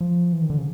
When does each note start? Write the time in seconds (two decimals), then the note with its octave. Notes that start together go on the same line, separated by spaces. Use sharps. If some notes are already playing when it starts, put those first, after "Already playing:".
0.01 F3
0.32 E3
0.42 D#3
0.50 D3
0.58 C#3